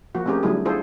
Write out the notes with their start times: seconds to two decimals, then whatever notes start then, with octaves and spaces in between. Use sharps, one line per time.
0.15 F3 A#3 F#4
0.26 A3 C4 C#4 G4 G#4 A#4
0.43 D3 F#3 G3 A3 E4 G#4
0.65 D4 E4 F4 G#4 A4 C5